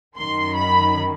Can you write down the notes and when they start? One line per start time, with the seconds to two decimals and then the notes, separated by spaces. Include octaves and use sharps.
0.17 F#2 D#3 C6
0.55 B5